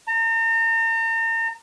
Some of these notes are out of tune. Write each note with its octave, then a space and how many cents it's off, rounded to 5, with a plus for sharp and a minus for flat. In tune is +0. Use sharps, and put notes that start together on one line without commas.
A#5 -40